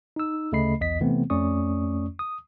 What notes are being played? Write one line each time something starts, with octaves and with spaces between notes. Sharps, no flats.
D#4 E6
D2 C#3 A3 D#5 B5 C7
B1 E2 D#5 B6
C3 E3 A3 B3 C4
F2 A3 C#4 D5 C#6 D#6
D#6